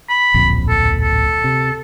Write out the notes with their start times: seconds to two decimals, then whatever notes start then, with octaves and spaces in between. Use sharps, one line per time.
0.09 B5
0.34 D1 A#1 F2
0.68 A4
1.01 A4
1.44 C3